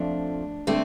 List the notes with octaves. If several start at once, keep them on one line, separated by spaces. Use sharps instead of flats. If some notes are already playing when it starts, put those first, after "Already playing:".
Already playing: F2 F3 A3 D4
D3 A3 C4